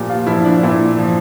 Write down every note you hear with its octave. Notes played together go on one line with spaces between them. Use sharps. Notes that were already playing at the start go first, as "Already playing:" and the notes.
Already playing: A#2 F3 G4
F4
F3 E4
D4
A#2 E4
F3